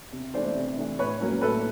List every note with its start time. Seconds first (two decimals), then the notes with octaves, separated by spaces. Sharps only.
0.12 C3
0.34 E3 A3 D4 C5 D5
0.56 C3
0.78 E3 A3 D4
0.99 A2 B4 C#5
1.20 F#3 A#3 C#4
1.41 A2 A4 B4